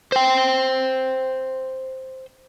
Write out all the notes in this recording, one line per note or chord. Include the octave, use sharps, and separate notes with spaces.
C5 G5